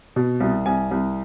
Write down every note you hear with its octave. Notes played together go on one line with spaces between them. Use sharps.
B2
C2
C2 G#5
C2